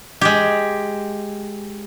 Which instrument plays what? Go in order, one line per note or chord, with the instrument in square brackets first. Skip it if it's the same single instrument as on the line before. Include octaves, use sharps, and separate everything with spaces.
[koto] G#3 G4